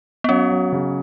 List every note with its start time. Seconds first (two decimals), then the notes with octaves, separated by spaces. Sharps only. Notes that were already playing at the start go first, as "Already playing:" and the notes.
0.24 B3
0.29 F#3 C#4
0.51 F#3
0.72 C#3